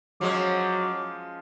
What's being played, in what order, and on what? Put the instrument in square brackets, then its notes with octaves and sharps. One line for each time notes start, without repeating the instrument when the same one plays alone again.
[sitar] F3 G#3 C#4 [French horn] F#3 [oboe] D6